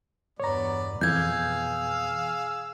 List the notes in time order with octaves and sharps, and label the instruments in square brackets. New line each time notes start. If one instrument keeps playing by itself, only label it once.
[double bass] E2 G2 [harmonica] B3 D5 [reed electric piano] C#5 A#5
[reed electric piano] F2 E3 [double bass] B2 [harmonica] G#4 F5 E6 [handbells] G6 G#6